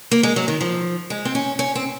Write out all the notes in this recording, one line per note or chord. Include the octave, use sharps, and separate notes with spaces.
A#3
G#3
F#3
D#3
F3
G#3
C4
C#4
C#4
C4